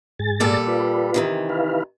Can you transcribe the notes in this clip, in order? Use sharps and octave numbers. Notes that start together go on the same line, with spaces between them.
G#2 G#4 A6
A#2 G3 A4
F4 B4
C3 D#3 E3
E4 B4 F5